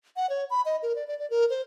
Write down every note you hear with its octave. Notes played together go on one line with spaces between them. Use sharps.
F#5
C#5
B5
D#5
A#4
D5
D5
D5
A#4
C5